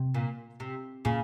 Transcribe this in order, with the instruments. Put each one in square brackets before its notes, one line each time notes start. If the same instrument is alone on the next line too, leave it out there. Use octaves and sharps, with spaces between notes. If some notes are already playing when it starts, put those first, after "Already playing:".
Already playing: [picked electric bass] C3
[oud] A#2
C3
[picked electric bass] A#2 [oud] C#3